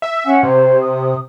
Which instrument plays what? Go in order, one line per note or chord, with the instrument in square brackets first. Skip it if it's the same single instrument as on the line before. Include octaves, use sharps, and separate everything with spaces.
[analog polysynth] E5
[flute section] C#4 F#5 G#5
[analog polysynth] C3 [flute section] C5 C#5
[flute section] D#6